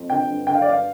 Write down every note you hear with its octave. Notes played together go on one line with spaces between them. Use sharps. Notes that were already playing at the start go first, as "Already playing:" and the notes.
Already playing: F2
D3 G5
G2
D3 G5
F5
D5
G2 F5